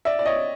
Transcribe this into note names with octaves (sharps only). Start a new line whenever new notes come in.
D5 E5
D5
C#5 D#5